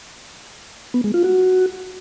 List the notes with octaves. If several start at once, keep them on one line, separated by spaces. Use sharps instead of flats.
B3
G#3
F4
F#4